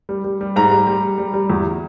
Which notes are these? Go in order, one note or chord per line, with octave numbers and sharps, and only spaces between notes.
G3
G3
G3
G#2 A#5
G3
G3
G3
G3
G3
E2